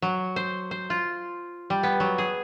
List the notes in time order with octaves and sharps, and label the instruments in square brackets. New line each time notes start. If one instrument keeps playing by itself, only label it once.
[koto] F#3
C5
C5
F4
G3
B3
F#3
G#4